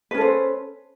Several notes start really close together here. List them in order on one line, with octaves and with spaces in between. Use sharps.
B4 C#4 A4 C5